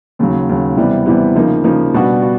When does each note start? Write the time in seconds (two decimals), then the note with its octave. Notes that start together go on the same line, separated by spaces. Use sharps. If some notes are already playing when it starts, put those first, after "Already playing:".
0.19 D#2 C#3 F#3
0.49 D#2 C#3 F#3
0.77 C3 E3 G3 B3
1.06 C3 E3 G3 B3
1.36 C#3 F3 A#3 D#4
1.64 C#3 F3 A#3 D#4
1.94 B2 G3 B3 D4 F#4
2.22 F#4